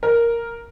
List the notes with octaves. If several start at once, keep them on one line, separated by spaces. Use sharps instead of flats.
A#4